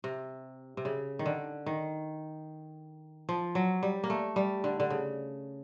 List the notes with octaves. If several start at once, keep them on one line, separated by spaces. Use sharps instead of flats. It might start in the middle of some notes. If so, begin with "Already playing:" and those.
C3
C3
C#3
D#3
D3
D#3
F3
F#3
G3
A#3
A3
G3
D3
D3
C#3